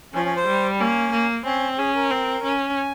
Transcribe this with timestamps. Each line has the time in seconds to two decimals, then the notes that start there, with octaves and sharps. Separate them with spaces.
0.14 F3 C#4
0.25 C#4
0.36 C5
0.47 G3
0.80 A#3 C#4
1.12 A#3
1.45 C4 C#4
1.78 C#4 G#4
1.95 A#4
2.10 C4
2.44 C#4
2.77 G#5